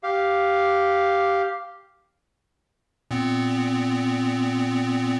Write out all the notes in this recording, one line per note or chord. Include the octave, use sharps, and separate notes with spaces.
G4 F5
A#2 B3 C4